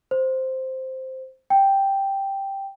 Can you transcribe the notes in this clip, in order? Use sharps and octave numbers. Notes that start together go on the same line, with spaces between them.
C5
G5